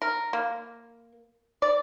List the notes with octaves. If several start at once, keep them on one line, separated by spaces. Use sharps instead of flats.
A#4
A#3
D5